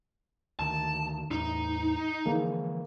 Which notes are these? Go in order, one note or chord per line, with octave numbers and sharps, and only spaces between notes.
D2 D#3 A5
E2 A2 D#4
D3 E3 F3 G#3 A#3